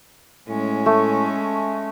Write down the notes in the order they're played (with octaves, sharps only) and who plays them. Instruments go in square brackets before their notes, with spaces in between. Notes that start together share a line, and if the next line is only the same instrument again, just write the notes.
[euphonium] A2 [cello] G#3 C#4
[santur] A3